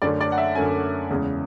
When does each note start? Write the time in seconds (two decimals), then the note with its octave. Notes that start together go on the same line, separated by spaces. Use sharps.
0.02 F#2 D3 A3 C#4 D5
0.21 D5
0.32 F#5
0.38 E5
0.55 F#2 D3 A3 C#4 G#5
1.10 E2 C#3 G#3